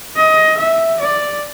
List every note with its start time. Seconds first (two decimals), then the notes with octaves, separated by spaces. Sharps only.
0.17 D#5
0.58 E5
1.00 D5